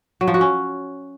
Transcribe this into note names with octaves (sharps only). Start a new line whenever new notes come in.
F#3
F3
F#4
C#4